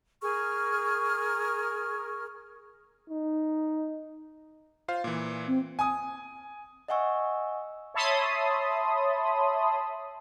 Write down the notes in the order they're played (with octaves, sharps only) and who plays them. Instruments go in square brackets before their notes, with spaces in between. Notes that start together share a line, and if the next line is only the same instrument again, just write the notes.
[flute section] G#4 A#4 C#6 F6
[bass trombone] D#4
[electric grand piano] F4 C5 F5
A#2 E3
[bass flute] C4
[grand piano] G#5 D#6
[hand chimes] D#5 E5 F#5 G#5 C#6 E6
[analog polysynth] C#5 E5 A5 B5 C6 D#6